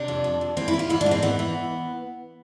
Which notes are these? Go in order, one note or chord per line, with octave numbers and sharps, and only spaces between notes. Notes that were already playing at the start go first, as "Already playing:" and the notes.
Already playing: C3 D4
F2
F3
F2
E3 C4
E4
E3
F4
G#2 E4
D4
G#2
C4
E3 B3
E3